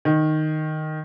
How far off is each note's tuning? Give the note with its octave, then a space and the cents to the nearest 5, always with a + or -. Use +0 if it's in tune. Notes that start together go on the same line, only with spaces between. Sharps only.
D#3 -5